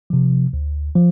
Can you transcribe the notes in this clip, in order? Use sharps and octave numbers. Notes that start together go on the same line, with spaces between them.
C3 F3
D2
F3